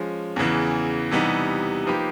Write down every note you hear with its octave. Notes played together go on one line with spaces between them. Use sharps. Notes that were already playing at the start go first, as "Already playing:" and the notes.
Already playing: F3 G#3 C#4
E2 C#3 E3
C3 E3 G3 B3 D#4
F3 A#3 D#4 G4 B4